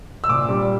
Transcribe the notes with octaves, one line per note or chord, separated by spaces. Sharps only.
E6
A#2 D6
G3